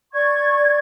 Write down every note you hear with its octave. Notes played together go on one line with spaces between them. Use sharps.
D5 C#6 G#6